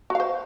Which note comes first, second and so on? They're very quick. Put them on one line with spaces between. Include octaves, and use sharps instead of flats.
F#4 F5 C5